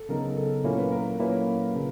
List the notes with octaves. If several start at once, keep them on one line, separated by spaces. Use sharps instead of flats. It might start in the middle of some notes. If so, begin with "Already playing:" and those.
Already playing: A4
C#3 F#3 B3 D#4 A#4
A4
A#2 F#3 A#3 C#4 E4 A#4
B4
A#4
A#2 F#3 A#3 C#4 E4 B4
C#3